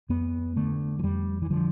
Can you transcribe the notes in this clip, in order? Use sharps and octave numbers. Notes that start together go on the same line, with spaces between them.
F2 B3
D3 A3
F3
F2 G3
E3
D3 F3